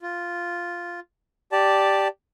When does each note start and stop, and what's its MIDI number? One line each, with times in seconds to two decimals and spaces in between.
0.02 1.00 65
1.52 2.08 67
1.52 2.08 74
1.52 2.08 81